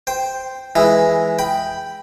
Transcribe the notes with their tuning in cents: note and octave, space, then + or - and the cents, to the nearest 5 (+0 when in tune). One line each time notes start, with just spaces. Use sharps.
C5 -5 G5 +0
E3 +0 G#3 +0 E4 +0
G5 +0 B5 +0